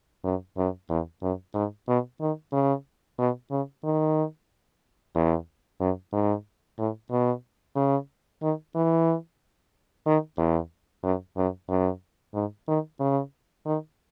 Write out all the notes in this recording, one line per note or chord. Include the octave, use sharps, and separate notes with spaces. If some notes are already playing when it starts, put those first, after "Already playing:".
F#2
F#2
E2
F#2
G#2
B2
D#3
C#3
B2
C#3
D#3
E2
F#2
G#2
A2
B2
C#3
D#3
E3
D#3
E2
F#2
F#2
F#2
G#2
D#3
C#3
D#3